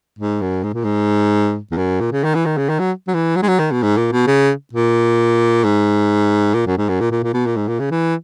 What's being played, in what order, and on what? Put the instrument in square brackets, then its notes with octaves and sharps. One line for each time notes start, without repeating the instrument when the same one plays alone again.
[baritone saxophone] G#2
F#2
G#2
A#2
G#2
E2
F#2
A#2
C#3
D#3
E3
D#3
C#3
D#3
F#3
F#3
E3
F#3
G#3
F#3
D#3
B2
G#2
A#2
B2
C#3
A#2
G#2
A#2
F#2
G#2
F#2
A#2
A#2
A#2
B2
A#2
G#2
A#2
C#3
E3